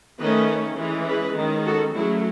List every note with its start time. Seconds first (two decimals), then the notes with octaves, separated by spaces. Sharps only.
0.19 D#3 A3 C#4 B4 D#5
0.78 E3 G#3 C#4
1.08 G#4 B4
1.37 D#3 G#3 C#4
1.66 F#4 A4
1.96 F#3 A3 C#4 E4 G#4